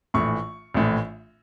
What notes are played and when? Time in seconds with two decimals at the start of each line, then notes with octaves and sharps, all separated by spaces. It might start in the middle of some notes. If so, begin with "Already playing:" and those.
0.14 A#1 A2 E3 C#6
0.74 A#1 A2 E3